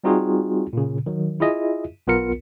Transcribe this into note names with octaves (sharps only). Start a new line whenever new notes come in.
G3 C4 D#4 F4 F#4 G#4
A#2 C#3
D#3 F#3
E4 F4 G#4 D#5 E5
B1 B3 F4 A#4 C#7